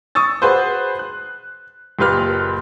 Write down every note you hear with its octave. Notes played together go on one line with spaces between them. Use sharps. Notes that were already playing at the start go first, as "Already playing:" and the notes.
C#6 D#6 E6 A6
F#4 G#4 B4 C5
F#6
F#1 A#2 G4 B4 F6